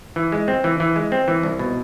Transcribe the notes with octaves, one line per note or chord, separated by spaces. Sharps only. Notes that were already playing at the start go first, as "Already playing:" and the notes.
E3
G#3
C4
E3
E3
G#3
C4
E3
C2
B2